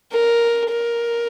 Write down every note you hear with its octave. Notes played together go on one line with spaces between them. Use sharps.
A#4
A#4